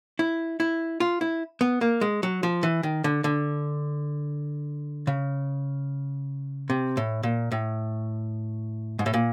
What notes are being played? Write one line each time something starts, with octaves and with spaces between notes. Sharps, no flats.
E4
E4
F4
E4
B3
A#3
G#3
F#3
F3
E3
D#3
D3
D3
C#3
C3
A2
A#2
A2
G#2
A2
A#2